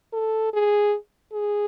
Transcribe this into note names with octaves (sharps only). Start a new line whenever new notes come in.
A4
G#4
G#4